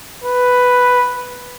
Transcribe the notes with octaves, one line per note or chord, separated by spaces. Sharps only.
B4